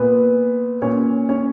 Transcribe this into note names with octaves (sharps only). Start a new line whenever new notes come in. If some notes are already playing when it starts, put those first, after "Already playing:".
Already playing: A#2 B3 B4
A#2 C#4 C#5
C#4 C#5